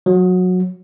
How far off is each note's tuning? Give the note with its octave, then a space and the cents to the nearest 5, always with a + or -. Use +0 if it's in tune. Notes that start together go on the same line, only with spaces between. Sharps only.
F#3 -20